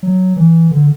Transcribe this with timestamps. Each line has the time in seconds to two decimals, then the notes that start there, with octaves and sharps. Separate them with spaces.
0.03 F#3
0.36 E3
0.71 D3